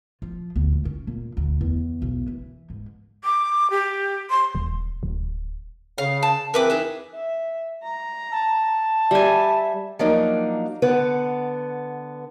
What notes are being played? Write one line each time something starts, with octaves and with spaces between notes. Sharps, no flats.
F3
D2
C#2
C#4
A#2
D2
E2
B1
E3
G#2
D6
G4
C6
D#1
D1
C#3 F5
A5
E2 E3 C4 A#4 B4 D6
D#4 G#4 E5
E5
A#5
A5
G3 E5 G#5
F3 F#3 A#3 D4 D#4
D3 B3 B4 F#5